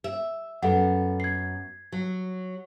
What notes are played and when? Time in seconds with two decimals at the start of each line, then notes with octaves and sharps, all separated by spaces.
0.04 E5
0.62 F#2 B3 A4 F#5
1.20 G#6 C7
1.92 F#3